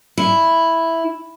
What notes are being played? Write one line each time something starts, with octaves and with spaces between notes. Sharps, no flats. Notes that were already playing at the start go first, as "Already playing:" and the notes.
E4